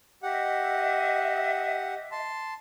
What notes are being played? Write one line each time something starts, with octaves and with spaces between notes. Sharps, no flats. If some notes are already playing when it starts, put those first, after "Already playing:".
G4 D#5 E5 F#5
A5 C6